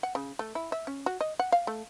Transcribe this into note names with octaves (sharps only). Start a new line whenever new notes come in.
F#5
C#3
A3
E4
E5
C#4
F#4
D#5
F#5
F5
A3